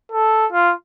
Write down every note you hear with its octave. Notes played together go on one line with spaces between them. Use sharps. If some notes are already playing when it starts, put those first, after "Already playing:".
A4
F4